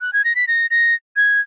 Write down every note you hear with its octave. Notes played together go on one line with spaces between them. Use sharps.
F#6
G#6
A#6
B6
A#6
A#6
G#6